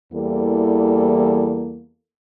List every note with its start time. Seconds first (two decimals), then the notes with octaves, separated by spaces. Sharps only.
0.13 E2 E3 G3 A#3 A4